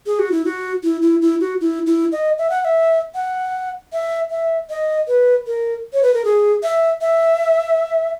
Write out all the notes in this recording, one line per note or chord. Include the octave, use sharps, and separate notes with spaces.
G#4
F#4
E4
F#4
E4
E4
E4
F#4
E4
E4
D#5
E5
F#5
F#5
E5
F#5
E5
E5
D#5
B4
A#4
C#5
B4
A#4
G#4
E5
E5